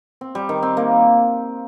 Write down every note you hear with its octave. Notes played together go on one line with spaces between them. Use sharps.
C4
G3
D#3
C4
A#3